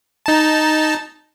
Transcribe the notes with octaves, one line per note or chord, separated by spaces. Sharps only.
D#4 A5